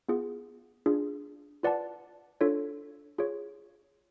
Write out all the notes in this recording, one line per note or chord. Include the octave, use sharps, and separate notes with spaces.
B3 F4 G#4
D4 F4 G#4
F4 B4 D5 F#5 A5
D4 F4 A4 C#5
F4 G#4 C#5